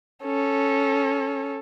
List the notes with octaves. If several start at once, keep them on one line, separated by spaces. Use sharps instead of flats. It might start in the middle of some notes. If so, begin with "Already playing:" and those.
C#4 A4